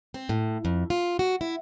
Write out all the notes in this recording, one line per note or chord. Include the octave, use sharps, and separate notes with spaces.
C4
A2
F2
F4
F#4
E4